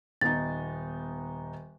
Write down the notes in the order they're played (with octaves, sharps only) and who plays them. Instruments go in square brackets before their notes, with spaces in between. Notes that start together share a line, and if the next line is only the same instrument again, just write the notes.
[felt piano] D#1 B3 D#4 [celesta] A6